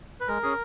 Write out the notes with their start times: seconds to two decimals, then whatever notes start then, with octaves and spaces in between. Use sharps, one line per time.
0.21 B4
0.28 G#3 A#4
0.43 C#4 G#4